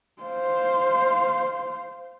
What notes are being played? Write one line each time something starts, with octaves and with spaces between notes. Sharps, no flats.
C5 F5